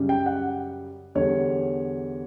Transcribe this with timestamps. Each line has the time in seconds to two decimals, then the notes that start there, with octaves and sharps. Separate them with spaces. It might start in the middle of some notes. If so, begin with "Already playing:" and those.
Already playing: F#2 C#3 G3
0.09 G5
0.26 F#5
1.15 E2 D3 G3 C#5